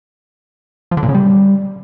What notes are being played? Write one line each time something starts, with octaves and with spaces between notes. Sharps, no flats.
F3
D3
A#2
C#3
G3